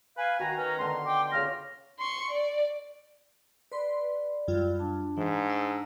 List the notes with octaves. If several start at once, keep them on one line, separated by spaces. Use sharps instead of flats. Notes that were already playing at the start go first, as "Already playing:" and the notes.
B4 F5 G#5
D#3 F#4 G#5 A#5
C#4 B4
B2 D3 C6
G5 D6
C#3 F4 C#6 F6 A#6
C6 C#6
D5
B4 D5 B5 C6
F#2 G3 F4
D4 A5
G#2 E3
E6